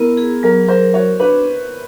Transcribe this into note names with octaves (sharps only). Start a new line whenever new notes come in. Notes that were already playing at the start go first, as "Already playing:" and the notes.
Already playing: B3 E4 A#4
G#4
F#3 A#4
A#4 C5
F#4 C#5
D4 B4